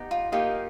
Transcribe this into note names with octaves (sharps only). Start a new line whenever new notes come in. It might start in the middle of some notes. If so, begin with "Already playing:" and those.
Already playing: B3 D#4 G4
F4
A#3 D#4 F4 G4